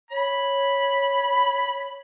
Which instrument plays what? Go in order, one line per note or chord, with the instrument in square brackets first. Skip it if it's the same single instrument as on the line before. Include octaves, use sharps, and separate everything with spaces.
[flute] C#5 [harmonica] B5